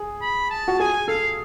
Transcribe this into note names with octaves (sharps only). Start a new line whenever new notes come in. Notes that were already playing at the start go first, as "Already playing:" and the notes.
Already playing: G#4
B5
A5
F#4
G#4 G#5
A4 F5